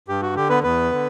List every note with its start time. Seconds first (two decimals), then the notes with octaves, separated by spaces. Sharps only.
0.08 G2 G4
0.22 F#4
0.36 D3 G4
0.50 B3 B4
0.63 E2 B3 B4
0.92 D3